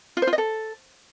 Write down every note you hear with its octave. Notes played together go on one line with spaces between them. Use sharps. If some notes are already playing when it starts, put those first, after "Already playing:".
F4
C5
F4
D#5
A4